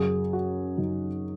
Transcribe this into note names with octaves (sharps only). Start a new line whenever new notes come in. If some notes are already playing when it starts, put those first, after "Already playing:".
Already playing: F#2 C#3 F#3 G#4
F#4
F#2 C#3 F#3 D#4